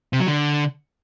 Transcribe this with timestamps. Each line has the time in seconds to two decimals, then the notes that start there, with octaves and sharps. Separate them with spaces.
0.13 C3
0.20 F#3
0.27 D3